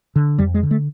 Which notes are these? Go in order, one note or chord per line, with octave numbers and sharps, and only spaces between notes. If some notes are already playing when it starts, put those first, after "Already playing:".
D3
F2 G3
G#3
D3
A3